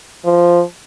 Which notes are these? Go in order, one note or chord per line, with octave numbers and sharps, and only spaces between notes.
F3